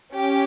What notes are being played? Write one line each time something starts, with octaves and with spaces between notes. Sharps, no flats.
C#4 G4